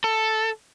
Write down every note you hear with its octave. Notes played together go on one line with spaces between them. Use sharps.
A4